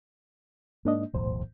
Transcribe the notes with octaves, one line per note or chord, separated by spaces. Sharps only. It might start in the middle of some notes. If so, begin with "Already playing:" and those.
G#2 A#3 D4 D#5
D1 B1 E2 A2 C5